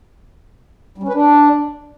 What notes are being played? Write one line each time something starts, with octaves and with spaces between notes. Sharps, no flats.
G3
C#4
B4
D4